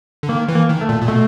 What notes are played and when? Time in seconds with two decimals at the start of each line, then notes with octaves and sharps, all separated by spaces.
0.23 D3
0.29 D#3 A#3
0.49 E3
0.55 A#3
0.69 D#3
0.81 A3
0.89 A#2
1.02 A#2
1.08 B2 A3